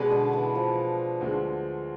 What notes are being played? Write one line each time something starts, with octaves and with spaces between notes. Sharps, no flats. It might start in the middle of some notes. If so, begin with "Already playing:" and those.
Already playing: B2 G#3 D4 G#4 B4
D3
E3
F3
D2 D3 G#3